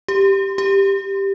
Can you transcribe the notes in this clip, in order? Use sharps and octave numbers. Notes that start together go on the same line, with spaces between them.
G4
G4